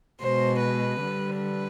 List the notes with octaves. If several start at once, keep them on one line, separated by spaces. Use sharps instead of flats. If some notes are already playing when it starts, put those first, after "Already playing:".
B2 G#3 C5
B4
D3 G3
B4